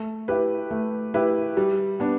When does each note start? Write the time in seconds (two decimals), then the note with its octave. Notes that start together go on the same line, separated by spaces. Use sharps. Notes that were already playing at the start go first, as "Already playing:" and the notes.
Already playing: A3
0.28 E4 G4 B4
0.71 A3
1.14 E4 G4 B4
1.57 G3
2.00 B3 D4